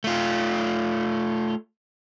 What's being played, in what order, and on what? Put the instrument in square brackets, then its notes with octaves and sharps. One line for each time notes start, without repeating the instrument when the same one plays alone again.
[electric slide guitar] A3 F4